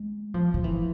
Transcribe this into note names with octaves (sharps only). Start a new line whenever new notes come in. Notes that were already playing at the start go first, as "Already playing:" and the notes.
Already playing: G#3
F3
F3
E3